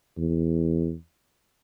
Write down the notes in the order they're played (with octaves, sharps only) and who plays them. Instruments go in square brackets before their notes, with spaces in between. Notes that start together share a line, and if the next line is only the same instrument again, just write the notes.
[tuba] E2